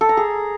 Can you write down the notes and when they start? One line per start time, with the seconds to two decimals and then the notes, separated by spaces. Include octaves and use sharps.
0.01 A4
0.09 A#5
0.17 G#4